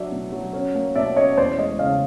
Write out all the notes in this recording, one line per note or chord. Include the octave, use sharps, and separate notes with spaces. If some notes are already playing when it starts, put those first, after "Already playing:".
Already playing: F#3 D4 D5 E5
B2
F#3
C#4
A#3
B2 D5 E5
C#4 C#5 D#5
E2 C5 D5
G#3 C#5 D#5
C#3 D#5 F5